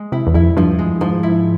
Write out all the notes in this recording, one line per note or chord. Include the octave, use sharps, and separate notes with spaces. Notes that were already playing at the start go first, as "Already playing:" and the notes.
Already playing: G#3
C3 E4
E2
F2 E4
G2 F3
G#3
G#2 F3
E4